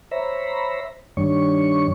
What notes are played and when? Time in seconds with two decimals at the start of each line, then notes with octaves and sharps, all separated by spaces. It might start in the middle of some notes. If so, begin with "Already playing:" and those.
0.11 C5 C#5 E5 A#5 B5
1.17 G2 D#3 G3 D4 C#5 C#6